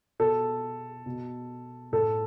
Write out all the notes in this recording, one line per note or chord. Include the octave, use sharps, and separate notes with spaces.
B2 A4
B2
A2 A4